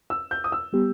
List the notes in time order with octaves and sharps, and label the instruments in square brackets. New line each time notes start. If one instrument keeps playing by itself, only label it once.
[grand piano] E6
G6
D#6
E6
[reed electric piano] G3 B3 G4